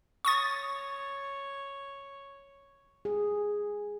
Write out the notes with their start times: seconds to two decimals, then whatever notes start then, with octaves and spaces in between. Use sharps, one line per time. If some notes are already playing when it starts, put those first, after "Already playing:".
0.25 C#5 C#6 D#6 A6
3.05 G#4